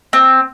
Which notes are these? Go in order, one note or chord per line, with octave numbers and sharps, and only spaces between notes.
C4